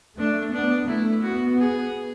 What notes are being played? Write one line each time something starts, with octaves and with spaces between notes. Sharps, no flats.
A3 D4
B3 D4
A3 E4
B3 F#4
G#4